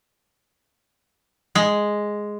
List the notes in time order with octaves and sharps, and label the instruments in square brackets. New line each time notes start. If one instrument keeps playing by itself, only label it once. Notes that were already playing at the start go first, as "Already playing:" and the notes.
[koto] G#3